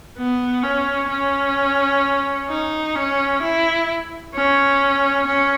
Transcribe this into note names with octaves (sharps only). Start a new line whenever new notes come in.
B3
C#4
C#4
D#4
C#4
E4
C#4
C#4